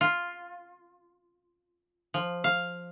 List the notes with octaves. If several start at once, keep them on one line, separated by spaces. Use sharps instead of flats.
F4
F3
F5